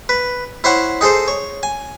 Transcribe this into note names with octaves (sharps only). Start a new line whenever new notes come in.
B4
E4 C5 C#5 F#5
D#4 G#4 A4 C5
C#5
G#5